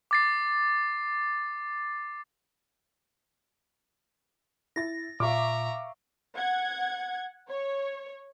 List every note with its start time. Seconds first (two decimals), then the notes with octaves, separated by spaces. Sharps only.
0.11 D6 A6 C7
4.76 E4 A6 A#6
5.20 A#2 E5 F5 A#5 C#6 D6
6.35 F#5 G#6
7.48 C#5